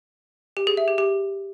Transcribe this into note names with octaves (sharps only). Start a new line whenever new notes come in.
G4
G#4
E5
G4
G4